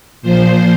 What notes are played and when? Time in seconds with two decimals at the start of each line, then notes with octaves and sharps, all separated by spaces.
0.22 A#2 F3 C5